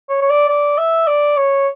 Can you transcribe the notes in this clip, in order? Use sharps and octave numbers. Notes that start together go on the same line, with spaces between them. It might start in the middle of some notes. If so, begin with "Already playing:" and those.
C#5
C#5
D5
D5
E5
D5
C#5